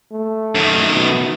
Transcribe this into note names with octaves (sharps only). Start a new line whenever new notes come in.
A3
F#2 D#3
B2